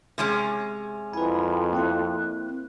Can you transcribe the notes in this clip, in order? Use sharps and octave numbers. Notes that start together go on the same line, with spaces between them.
C3 G#3 C#4
F2 E4 B4 G#5 A#5 B5
A#3 C4 E4 F#6